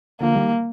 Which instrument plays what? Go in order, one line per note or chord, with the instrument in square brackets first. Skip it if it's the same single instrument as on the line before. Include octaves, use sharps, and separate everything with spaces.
[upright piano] D3 F3 [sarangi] A#3
[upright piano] D#3 G3